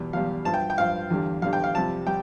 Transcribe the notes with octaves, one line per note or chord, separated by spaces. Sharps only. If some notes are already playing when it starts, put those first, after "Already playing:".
Already playing: E2 B2 G3
E2 B2 G3 F5
G2 F3 A5
G5
G5
G2 F3 F5
E2 D3 G3
E2 D3 G3 F5
G5
F5
F2 C3 G3 A5
G3 G5